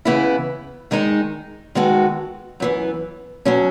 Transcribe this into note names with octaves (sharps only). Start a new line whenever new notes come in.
C#3 E3 B3 E4
D#3 G#3 D#4 G#4
D#3 G#3 B3 F#4 A4
F#2 E3 B3
B2 F#3 C#4